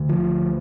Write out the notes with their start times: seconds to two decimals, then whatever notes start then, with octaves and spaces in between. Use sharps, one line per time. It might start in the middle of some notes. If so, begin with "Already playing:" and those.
Already playing: D2 D3
0.09 F3